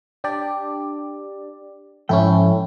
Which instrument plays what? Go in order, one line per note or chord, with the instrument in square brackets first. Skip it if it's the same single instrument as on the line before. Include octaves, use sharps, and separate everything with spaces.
[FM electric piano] D4 G4 D5
[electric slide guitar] G#2 F3 G5 [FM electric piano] C#4 E4 A4